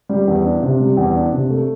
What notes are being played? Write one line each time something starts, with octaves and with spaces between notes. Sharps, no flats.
G3
E2
D4
C3
G3
E2
D4
C3
A3